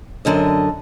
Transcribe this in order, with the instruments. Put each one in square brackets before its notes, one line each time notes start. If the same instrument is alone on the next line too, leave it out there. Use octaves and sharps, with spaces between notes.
[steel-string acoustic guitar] F#2 D3 D#5